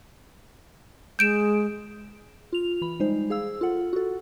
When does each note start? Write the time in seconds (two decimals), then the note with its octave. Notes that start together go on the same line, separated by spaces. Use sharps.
1.19 G#3 G6 D7 E7
2.53 F4 F7
2.81 E3 B5
3.00 G3 G#3 D#4 C5
3.30 G#4 F5 E6
3.61 F4 A4 F#5
3.93 F#4 A4